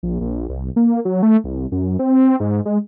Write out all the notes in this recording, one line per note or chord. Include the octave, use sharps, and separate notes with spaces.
A#1
A#1
C2
A#3
F#3
A3
C2
F#2
C4
G#2
G#3